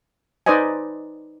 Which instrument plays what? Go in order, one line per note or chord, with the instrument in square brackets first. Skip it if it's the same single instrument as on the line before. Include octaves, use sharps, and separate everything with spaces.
[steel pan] D#4 B4 C5 D5 D#5 G#5